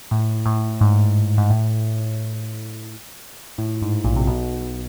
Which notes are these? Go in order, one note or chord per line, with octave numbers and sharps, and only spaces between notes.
A2
A2
G#2
G#2
A2
A2
G#2
A#1 A#2
C3
B1 B2